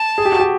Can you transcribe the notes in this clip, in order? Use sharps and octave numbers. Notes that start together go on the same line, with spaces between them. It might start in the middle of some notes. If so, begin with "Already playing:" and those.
Already playing: A5
G#4
G4
F#4
G4